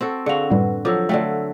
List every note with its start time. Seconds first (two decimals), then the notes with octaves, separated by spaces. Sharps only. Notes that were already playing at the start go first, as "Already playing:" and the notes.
0.01 C4 F#4 A4
0.26 D3 F#4 G#4 F5 C#7 F7
0.50 F#2 A2 G3 B4 F#5
0.85 F3 F#3 A4 D6 E6
1.09 D3 F#3 A3 F5 G5